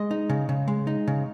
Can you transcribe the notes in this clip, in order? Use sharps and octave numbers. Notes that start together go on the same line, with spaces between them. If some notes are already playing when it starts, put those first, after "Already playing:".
Already playing: G#3 D#5
D#4
C#3
C#3
G#3
D#4
C#3